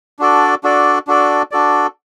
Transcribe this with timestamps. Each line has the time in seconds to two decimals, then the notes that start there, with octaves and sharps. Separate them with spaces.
0.19 D4 F#4 A4 D5
0.63 D4 F#4 A4 D5
1.07 D4 F#4 A4 D5
1.51 D4 F#4 A4 D5